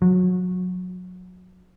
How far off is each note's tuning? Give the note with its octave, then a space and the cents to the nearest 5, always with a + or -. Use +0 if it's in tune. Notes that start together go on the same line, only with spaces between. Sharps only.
F#3 -25